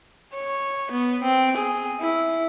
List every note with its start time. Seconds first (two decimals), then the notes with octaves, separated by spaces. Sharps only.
0.34 C#5
0.91 B3
1.23 C4
1.57 G#4
2.01 E4